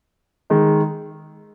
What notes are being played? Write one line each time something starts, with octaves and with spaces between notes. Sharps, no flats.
D#3 G#3 D#4